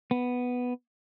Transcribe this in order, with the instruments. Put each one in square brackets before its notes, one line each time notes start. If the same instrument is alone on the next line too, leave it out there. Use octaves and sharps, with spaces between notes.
[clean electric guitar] B3